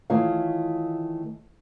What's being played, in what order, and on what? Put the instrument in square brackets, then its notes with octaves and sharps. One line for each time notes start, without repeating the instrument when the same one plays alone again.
[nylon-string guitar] D#3 E3 A3 F4 C#5 F5